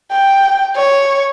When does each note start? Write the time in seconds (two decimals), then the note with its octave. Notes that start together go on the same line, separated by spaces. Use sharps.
0.11 G5
0.76 C#5